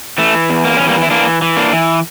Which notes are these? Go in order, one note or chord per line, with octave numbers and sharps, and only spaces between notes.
E3 A3
E2
A#3
E3 C#4
G3 A#3
E4
E3 A#3 D4
E3
A#3 D4
E3